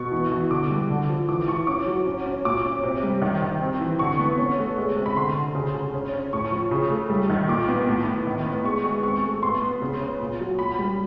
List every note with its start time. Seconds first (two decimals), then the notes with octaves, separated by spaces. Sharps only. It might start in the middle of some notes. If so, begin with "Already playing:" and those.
Already playing: B2 C#6
0.12 E3
0.32 E3
0.51 D3 D6
0.70 G3
0.90 D3
1.09 F3
1.29 E3 D6
1.48 E3 C#6
1.67 C#4 D6
1.86 F#3
2.06 C#4
2.26 C#4
2.45 A#2 D6
2.65 C#4
2.83 C3
3.03 G3
3.22 D#3
3.42 D#3
3.61 C4
3.81 E3
3.99 D3 C#6
4.19 B3
4.38 C#4
4.58 A3
4.78 G#3
4.96 C3
5.06 B5
5.17 D3 C6
5.36 D3
5.55 C#3
5.74 C#3
5.94 C#4
6.13 C#4
6.33 A2 C#6
6.51 F3
6.71 C#3
6.90 A3
7.10 G3
7.30 D#3
7.48 A#2 D6
7.68 B3
7.88 A2
8.07 A2
8.27 D#3
8.46 B3
8.64 G#3 C#6
8.85 G#3
9.03 C4 C#6
9.23 A3
9.42 B3 C6
9.61 B3
9.82 C#3
10.00 C#4
10.20 A#2
10.40 F#3
10.59 A#2 B5
10.79 G3